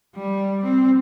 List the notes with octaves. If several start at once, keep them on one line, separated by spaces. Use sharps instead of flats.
G3
C4